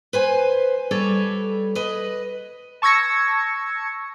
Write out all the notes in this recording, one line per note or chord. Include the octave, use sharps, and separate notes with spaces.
B4 C5 G#5
G3 A4 B4 C#5 D5
B4 D#5
A5 C#6 E6 G#6 A#6 C#7